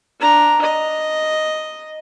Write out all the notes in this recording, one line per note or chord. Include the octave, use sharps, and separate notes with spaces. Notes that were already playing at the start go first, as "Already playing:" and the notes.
D4 A#5
D#5